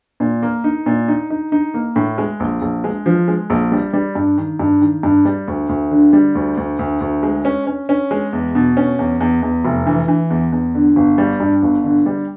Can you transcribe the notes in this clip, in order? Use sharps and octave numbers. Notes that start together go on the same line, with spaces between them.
A#2
A#3
D#4
A#2
D#4
D#4
D#4
A#3
A2
G#3
A#1
A#1
G#3
F3
G#3
A#1
G3
G3
G2
D#3
G2
D#3
G2
G3
D2
D2
D3
G3
D2
D2
D2
D2
G#3
C#4
C#4
C#4
G#3
E2
B2
C#4
E2
E2
E2
F1
E3
E3
E2
E2
D3
G1
G3
G2
G1
D3
G3